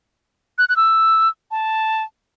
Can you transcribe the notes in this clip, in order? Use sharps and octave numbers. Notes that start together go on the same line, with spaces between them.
F#6
F#6
E6
A5